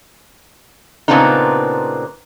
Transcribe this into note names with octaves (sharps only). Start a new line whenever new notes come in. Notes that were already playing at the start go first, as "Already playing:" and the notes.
A#2 C#3 B3 C4 D4 D#4